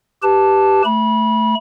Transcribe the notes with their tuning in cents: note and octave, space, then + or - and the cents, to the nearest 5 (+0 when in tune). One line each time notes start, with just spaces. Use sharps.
G4 +0 B4 +0 A5 +0
A3 +0 B5 -25